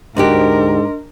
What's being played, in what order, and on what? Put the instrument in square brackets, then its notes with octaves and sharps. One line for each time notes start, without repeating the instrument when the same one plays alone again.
[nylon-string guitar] D2 F#4 G4 [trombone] G#2 [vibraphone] D4 D#5 C6 [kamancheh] A#4